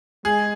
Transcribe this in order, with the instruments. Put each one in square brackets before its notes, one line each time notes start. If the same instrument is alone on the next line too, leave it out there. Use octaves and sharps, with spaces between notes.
[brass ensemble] G#3 [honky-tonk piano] G#4